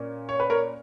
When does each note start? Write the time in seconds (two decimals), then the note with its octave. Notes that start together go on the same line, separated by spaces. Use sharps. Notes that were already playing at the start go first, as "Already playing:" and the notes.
Already playing: A#2 A#3 C#4
0.29 C#5
0.40 B4
0.50 A#4 C#5